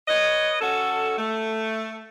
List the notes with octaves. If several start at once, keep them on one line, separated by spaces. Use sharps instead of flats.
B4 C#5 D#5
C#4 F#4 A4
A3